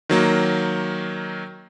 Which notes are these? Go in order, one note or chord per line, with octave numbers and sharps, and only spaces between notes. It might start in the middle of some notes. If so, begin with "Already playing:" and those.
D#3 F#3 A#3